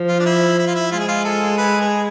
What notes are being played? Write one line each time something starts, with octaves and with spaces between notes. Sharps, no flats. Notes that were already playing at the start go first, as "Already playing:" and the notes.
Already playing: F3
F4
D4
E4
E4
F4
E4
G#3 F4
G#4
F4
A4
B4
G#4